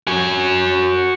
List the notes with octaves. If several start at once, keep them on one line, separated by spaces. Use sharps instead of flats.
F#4 G#5